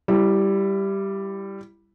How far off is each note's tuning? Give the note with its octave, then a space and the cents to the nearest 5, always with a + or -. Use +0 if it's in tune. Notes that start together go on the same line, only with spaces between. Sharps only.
G3 +0 E4 +20